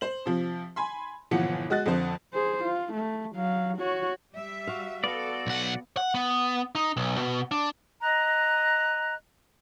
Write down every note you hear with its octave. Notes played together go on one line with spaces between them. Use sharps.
C5 F#7
C3 F3
G#5 B5 C6
G1 A#2 E3 F3 F#5 C#7
G#3 F#4 D#5 F#6 A6
F2 D3 F3 C5
G#4 C5
F4
A3
F#3 F5
F#4 C#5
G3 E5
F#4 F5
B3 F#4 A4 D5 F5
B1 F#5
F#5
B3
D#4
B1
B2
D4
D#5 A#5 F#6